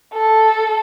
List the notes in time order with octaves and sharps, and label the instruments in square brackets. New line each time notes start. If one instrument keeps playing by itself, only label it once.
[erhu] A4